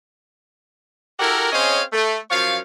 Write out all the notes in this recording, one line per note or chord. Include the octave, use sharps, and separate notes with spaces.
E4 F#4 G4 A4 A#4
C4 C#4 G#4 C#5 D#5 F5
A3
F#2 F3 C#5 F5